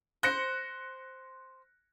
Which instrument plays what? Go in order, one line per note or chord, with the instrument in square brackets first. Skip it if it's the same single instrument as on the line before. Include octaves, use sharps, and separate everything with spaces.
[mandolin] C5 [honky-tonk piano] F#6 A#6 C#7